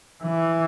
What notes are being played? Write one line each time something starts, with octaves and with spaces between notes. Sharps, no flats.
E3